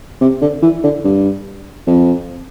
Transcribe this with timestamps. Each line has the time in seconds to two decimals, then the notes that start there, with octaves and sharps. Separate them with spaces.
0.21 C3
0.41 D3
0.62 E3
0.83 D3
1.04 G2
1.87 F2